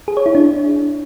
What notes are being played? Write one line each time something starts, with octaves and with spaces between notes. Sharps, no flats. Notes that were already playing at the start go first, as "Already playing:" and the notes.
G#4
C#5
E4
D4